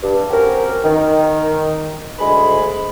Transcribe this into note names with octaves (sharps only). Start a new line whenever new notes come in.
G2
C4 C#4 F#4 G4 A#4
D#3
D2 G#3 G#4 B5